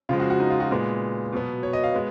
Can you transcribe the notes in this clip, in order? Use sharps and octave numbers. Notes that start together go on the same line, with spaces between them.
C#3 F3 G#3 F4
F#4
F#4
D#4
F4
F#4
A#2 G#3 B3
B2 F#3 B3
C#5
D#5
F5
G#3 B3